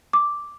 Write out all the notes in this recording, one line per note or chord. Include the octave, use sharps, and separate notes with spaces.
D6